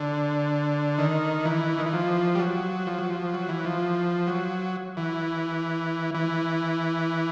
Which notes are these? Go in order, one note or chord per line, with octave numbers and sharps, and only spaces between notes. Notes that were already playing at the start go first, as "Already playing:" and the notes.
Already playing: D3
D#3
E3
D#3
E3
F3
G3
F#3
F3
F#3
F3
F#3
E3
F3
F#3
E3
E3